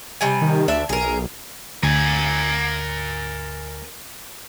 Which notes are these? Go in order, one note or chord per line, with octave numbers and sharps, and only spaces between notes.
C3 G3 G#5
D#3
D2 D4 E5
B1 G#4 A#4
D2 A#4 G#5